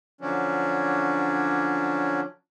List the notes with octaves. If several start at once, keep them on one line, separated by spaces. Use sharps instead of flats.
D3 F3 F#3 C#4 D4